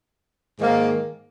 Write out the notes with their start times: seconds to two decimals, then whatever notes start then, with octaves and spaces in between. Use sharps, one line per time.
0.59 G#2 D#3 A#3